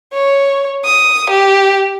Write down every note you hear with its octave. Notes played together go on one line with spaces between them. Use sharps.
C#5
D#6
G4